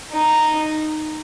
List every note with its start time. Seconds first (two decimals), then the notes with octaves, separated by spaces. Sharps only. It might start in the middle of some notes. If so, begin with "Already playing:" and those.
0.12 D#4